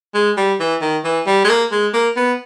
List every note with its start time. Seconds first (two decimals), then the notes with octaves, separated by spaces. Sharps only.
0.14 G#3
0.37 G3
0.60 E3
0.81 D#3
1.04 E3
1.26 G3
1.45 G#3
1.49 A#3
1.71 G#3
1.94 A#3
2.16 B3